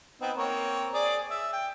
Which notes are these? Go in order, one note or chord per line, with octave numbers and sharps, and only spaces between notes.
B3 C4 D#4
A#3 C4 C#5
G#4 D5
E5
G5